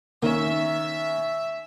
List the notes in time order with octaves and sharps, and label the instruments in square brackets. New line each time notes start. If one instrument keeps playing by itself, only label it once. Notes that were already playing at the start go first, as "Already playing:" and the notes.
[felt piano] D#3 C#4 [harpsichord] A#3 [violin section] E5